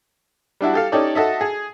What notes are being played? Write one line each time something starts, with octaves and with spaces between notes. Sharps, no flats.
G3 D4 E4 F#4
G4 A4 F5
C#4 D#4 G4 A4 C#5 D5
F#4 A4 D#5 E5
G#4